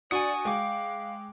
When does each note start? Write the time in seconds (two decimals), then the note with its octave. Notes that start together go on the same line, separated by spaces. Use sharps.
0.11 D4 F#4 D5 G#5 C#6 D#6 C#7
0.45 G#3 F5 G5 D6